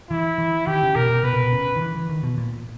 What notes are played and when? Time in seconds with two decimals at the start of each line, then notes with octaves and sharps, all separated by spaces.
0.10 E3 E4
0.38 E3
0.67 D#3 G4
0.83 C#3
0.96 B2 A#4
1.09 B2
1.24 B2 B4
1.34 B2
1.44 B2
1.52 C#3
1.76 D#3
1.81 E3
1.95 E3
2.09 D#3
2.23 B2
2.38 A#2